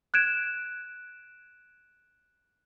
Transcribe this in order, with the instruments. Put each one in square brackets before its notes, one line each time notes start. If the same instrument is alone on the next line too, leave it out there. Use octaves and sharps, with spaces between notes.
[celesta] F#6 G#6 D7 E7